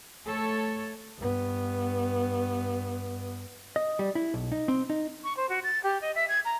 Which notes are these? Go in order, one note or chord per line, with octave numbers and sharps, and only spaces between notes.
A3 A4 C#5
G2 B3
D#5
G3
E4
B1
D#4
C4
D#4
C#6
C5
F#4
A6
G4
D#5
E5
G#6
A#5